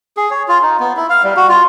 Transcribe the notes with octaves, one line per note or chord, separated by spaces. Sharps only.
G#4
C#5
F4
D#4
B3
E4
F5
G3
F#4
F4